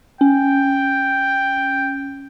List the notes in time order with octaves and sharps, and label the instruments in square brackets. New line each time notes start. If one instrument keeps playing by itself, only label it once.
[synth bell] C#4 [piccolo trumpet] G5